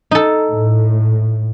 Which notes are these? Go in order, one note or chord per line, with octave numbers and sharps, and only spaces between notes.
D#4 A4
A2